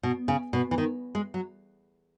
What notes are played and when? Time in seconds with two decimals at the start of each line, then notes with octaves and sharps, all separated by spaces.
0.03 B2
0.28 C#3
0.53 B2
0.71 E3
0.78 D#3
1.15 G#3
1.34 F#3